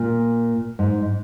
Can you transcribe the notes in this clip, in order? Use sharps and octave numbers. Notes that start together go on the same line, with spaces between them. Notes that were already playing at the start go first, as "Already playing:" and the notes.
Already playing: A#2
G#2